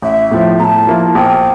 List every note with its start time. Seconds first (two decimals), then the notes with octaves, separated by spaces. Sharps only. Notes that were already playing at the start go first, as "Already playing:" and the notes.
0.02 A1 E5
0.31 A2 F3
0.59 A2 A5 A#5
0.87 F3 A#3 E4
1.15 A#1 G5